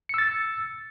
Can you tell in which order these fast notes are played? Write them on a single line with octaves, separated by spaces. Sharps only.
C#7 E6 A6